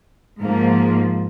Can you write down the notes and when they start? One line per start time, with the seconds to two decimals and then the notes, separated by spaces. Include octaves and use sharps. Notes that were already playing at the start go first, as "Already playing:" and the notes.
0.39 G#2 F3 A#3